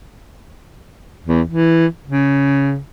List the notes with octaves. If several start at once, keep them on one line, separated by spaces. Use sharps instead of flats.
E2
E3
C#3